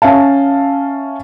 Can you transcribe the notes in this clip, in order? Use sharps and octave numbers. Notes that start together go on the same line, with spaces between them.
C#4 E5 F5 A5